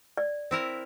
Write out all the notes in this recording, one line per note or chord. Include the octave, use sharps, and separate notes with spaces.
D5
C4 E4 A#4